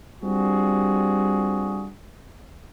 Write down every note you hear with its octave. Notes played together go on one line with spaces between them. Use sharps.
G3 C4 D4 F4 F#4 G#4